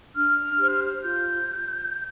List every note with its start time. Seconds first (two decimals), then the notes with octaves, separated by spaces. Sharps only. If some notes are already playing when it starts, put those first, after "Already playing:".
0.15 D4 F6
0.59 G4 C5
1.02 F4 G6